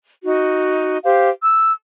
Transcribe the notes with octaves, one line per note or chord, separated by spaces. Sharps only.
D#4 F#4
G4 C5 F5
E6